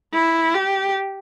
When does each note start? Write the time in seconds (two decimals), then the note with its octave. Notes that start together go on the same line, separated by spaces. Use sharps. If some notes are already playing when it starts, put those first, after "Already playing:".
0.14 E4
0.55 G4